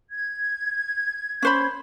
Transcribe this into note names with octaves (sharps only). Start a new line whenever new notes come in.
G#6
C#4 C5 B5